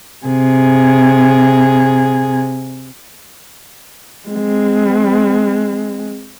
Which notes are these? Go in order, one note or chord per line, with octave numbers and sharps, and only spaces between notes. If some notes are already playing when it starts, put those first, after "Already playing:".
C3 G#4
G#3 C4